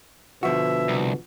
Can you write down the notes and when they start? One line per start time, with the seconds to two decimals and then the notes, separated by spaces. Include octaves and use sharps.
0.43 B2 D3 F3 F#4 E5
0.88 C2